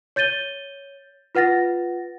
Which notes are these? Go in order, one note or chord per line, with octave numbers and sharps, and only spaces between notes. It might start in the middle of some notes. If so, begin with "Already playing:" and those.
C#5 G6 A6 D#7 G7
F4 B4 F#5 A6 A#6